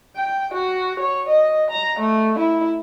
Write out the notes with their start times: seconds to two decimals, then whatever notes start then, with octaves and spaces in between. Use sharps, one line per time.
0.16 G5
0.54 F#4
0.99 C#5
1.29 D#5
1.71 A#5
1.99 A3
2.39 E4